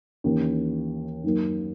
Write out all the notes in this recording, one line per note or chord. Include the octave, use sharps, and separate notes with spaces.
D#2 C#3 E3
F#2 D#3 F#3 A#3